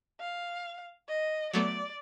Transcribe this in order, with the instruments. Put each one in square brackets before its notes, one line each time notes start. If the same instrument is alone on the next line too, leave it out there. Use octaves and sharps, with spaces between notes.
[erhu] F5
D#5
[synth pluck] F#3 A3 B3 [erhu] D5